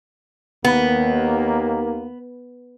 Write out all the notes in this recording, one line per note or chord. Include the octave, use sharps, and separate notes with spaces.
D#2 A#3 B3